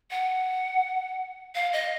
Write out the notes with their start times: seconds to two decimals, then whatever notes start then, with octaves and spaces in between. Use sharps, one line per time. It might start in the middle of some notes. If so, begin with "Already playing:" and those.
0.11 F#5
1.55 F5
1.73 D#5